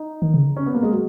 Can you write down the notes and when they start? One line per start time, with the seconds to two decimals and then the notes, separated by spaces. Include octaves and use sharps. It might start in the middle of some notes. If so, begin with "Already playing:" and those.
Already playing: D#4
0.22 D#3
0.34 C#3
0.57 C#4
0.66 B3
0.74 A#3
0.83 G#3
0.92 F#3